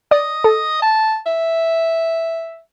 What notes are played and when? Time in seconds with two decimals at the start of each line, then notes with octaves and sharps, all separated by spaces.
0.11 D5 D#5
0.44 A4
0.82 A5
1.26 E5